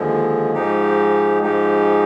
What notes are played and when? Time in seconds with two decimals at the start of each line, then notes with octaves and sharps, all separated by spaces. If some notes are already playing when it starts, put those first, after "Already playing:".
Already playing: D#2 D3 F3 G#3
0.54 G#2 F3 G#3 D#4 G4
1.43 G#2 F3 G#3 D#4 G4